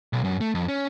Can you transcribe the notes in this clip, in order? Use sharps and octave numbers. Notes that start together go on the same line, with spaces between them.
B1
F#2
A3
F2
C#4